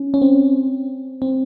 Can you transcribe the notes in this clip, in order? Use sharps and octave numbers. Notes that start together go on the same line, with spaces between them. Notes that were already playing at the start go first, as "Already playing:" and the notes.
Already playing: C#4
C#4
C4
C4